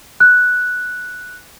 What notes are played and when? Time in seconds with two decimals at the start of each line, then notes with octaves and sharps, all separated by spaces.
0.20 F#6